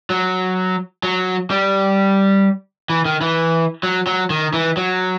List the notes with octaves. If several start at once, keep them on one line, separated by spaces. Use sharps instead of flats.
F#3
F#3
G3
E3
D#3
E3
F#3
F#3
D#3
E3
F#3